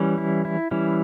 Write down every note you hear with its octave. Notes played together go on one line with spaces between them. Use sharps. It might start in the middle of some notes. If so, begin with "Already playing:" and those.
Already playing: E3 G3 C#4
E4
E4
E3 G3 C#4 E4